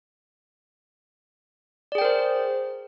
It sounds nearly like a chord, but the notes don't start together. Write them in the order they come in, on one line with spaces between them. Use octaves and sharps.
D5 G#4 G5 A#4 C5